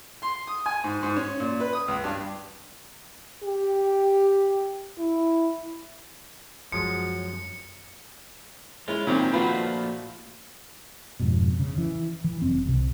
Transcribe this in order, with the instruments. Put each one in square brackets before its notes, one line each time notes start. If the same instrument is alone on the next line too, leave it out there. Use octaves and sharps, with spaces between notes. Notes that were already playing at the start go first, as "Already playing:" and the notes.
[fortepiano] C6
D#6
G#5
G#2
G#2
C#4
A#2
B4
D#6
C#2
G2
[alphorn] G4
E4
[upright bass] F#2 [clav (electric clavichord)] F3 G#3 [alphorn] F#3 [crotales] C#7
[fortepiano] G#3 [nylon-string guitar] C#4 E4 [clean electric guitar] F4
[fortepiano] A#2 D#3 C4 [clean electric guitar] F#3 C#4 [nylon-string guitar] E4
[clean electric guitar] A#2 F3 A3 [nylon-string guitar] F4 F#4 [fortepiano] B4
[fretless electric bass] F2 G#2 B2
C#3
E3
E3
F1 F#2 C4
C2 C3